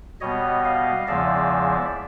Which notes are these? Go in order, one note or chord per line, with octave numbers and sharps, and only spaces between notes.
B2 G3 B3 C#5 D#5
D#5 F5
E2 C#3 F3 G#3 D5 E5